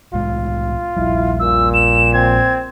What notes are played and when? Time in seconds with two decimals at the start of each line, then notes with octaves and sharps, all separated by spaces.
0.13 C2 A2 G#3 F4
0.97 A#1 F3 G3 E4
1.40 A#2 E6
1.74 E7
2.14 C4 G#6